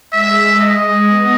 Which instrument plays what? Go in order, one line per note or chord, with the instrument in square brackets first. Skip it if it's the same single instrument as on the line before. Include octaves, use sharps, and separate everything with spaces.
[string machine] G#3 [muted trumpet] E5
[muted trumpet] D#5
[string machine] B3